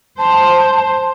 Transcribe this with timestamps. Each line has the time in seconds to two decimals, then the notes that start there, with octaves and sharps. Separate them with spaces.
0.19 C5 A5